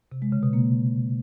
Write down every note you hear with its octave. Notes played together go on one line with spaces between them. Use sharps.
C3
G#3
C#3
B2
A#3